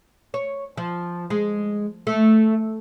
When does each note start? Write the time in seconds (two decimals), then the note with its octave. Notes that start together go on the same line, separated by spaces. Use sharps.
0.34 C#5
0.77 F3
1.30 G#3
2.07 A3